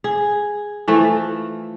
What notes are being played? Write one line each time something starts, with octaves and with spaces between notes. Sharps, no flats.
G#4
E3 F3 A3